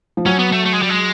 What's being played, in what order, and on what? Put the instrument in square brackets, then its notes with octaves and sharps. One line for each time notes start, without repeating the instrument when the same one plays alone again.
[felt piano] F3
[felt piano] F#3 [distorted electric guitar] C#4
[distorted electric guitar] B3
A3
A3
G#3
G3
G#3